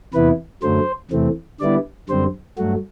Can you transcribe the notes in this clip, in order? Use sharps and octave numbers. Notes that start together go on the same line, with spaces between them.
E2 C3 E3 B3 E4 B4
F#2 D3 F#3 A3 C5
E2 C3 E3 A3 C4
D3 G3 B3 E4 D5
F#2 D3 G3 C4 C5
G2 F#3 A3 F#4